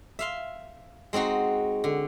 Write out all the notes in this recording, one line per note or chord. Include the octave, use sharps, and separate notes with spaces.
E5 F5 C6
G#3 C4 D#4 F#4
D3